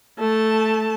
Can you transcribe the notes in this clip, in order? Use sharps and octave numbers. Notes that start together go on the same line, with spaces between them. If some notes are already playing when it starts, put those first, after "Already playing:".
A3 A5